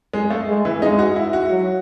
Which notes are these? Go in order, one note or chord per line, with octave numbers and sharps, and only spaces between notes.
G#3
A3
G#3
E3
G#3 D#4
F#4
E4
F#4
F#3